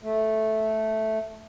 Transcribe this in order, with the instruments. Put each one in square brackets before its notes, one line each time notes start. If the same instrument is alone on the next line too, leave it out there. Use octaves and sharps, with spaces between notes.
[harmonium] A3